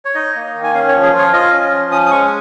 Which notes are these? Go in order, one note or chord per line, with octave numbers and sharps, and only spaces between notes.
C#5
D#4 D#5
A#3
D#3
G#5
C#4 F5
C#5
F3
G#4
F4 C#5
F4 D#5
C#4
F3
C#4 D#6
D#6
G#3 C#6